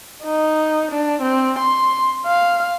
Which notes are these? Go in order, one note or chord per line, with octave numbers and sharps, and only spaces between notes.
D#4
D4
C4
C6
F5